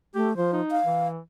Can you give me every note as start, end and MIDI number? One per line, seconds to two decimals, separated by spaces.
0.15 0.36 57
0.15 0.30 67
0.37 0.61 53
0.37 0.49 72
0.53 0.79 63
0.71 1.07 77
0.86 1.19 52